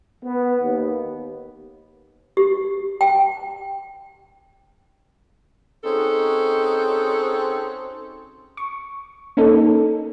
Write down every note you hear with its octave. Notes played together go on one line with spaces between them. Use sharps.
B3
D#2
G4
G5
C4 C#4 D#4 F#4 G#4 A4
C#6
A#3 C#4 D#4 A4